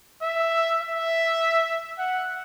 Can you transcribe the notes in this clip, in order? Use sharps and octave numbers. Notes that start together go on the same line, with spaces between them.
E5
E5
F#5